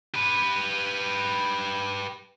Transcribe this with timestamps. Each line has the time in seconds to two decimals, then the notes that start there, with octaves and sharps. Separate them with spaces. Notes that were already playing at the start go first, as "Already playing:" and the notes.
0.14 G4 B4